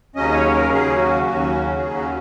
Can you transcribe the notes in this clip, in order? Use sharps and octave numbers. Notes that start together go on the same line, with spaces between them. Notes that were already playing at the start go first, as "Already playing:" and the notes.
D#2 C#3 F#3 C#4 D#5
C#5
A#4
D#2 C#3 F#3 C#4 G#4
F#4
D#2 C#3 F#3 C#4
D#2 C#3 F#3 C#4 G#4
F#4